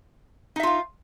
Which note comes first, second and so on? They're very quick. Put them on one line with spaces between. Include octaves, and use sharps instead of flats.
D#4 E5 F4 F5